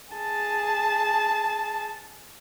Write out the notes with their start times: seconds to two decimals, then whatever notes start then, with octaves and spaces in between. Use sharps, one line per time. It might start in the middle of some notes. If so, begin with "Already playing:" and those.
0.13 G#4 A5